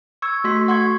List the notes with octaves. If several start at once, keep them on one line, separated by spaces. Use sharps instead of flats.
C#6 E6 G#6
A3 F#4 C6 B6
F#5 C6 C#6 G#6